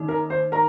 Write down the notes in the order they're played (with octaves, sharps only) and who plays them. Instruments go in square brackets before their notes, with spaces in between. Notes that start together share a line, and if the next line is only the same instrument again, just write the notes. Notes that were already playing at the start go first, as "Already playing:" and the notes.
Already playing: [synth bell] D#3 A#3 D#4
[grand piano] A#4
C5
A#4 A#5